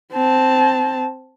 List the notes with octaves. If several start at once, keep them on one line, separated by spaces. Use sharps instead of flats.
C4 A5